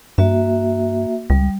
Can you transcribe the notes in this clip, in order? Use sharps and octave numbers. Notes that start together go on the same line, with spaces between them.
G2 A#3 F#4 E5
C#2 G3